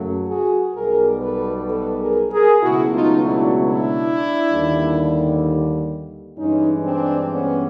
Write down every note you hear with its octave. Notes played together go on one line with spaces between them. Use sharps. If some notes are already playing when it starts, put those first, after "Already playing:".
Already playing: F#2 C#3 F#3 A3
F#4 G#4
B1 B2 G3 G#4 A#4
A4 B4
A4 B4
G#4 A#4
G#4 A#4
C#2 B2 F#3 A3 E4 F#4
D#4 F4
D4 E4
D4 E4
D#2 D3 G3
G2 E3 G#3 C#4 D#4
C4 D4
B3 C#4